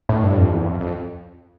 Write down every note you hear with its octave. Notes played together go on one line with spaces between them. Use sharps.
A2
G2
F2
E2
F2
F2